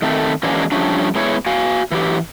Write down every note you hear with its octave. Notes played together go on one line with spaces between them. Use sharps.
D#3 A3 C4 A4
E3 F#3 G#3 A#3 C#4 D4
F3 G3 A3 C#4 D4
G#3 B3 E4 C#5
F#4 F5 G#5
E3 F#3 G4